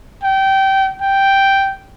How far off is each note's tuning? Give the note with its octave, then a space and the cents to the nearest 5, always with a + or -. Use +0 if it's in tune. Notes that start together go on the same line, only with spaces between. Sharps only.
G5 -20
G5 -5